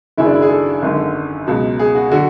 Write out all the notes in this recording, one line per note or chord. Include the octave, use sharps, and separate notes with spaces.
G#1 F#2 C#3 F#3 E4
D4
E4
G#4
A4
G#1 F#2 D3
C#2 B2 F#3
G#4
F#4
D3 F#3 F#4